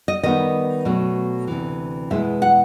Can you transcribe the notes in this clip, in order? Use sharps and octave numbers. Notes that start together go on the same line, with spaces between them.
D#5
D#3 G3 B3 D#4 D#5
B2 F#3 A3
D2 C3 E3
E2 B2 G#3 B3 E4 E5
F#5